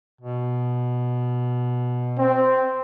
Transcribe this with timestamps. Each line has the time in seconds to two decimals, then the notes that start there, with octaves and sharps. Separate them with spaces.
0.21 B2
2.19 C4